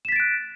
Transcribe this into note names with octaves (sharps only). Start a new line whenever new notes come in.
F#6 A6 B6 D7 E7